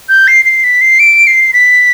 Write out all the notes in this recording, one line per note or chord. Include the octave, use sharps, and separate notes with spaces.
G6
C7
C7
B6
C7
D7
C7
B6